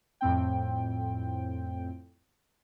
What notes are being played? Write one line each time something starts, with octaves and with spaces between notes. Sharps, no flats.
F2 A2 C4 G5